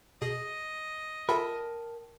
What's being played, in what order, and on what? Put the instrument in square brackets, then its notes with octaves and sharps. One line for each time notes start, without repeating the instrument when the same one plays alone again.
[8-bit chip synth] B2 G#4 [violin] D#5
[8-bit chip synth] F4 A4 E5 [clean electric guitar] A#4 G5 A5 [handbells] B5